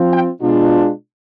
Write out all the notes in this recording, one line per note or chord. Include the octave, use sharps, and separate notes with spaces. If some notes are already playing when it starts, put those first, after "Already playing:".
Already playing: F3 C4 F4
G5
B2 G#3 D4 F4